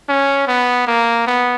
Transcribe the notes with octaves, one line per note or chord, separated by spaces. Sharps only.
C#4
B3
A#3
B3